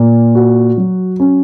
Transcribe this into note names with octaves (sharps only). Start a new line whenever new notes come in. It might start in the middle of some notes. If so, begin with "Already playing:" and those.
Already playing: A#2
F#4
F#3
C#4